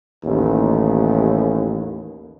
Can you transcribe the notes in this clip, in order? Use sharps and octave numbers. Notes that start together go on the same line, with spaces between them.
A1 D#2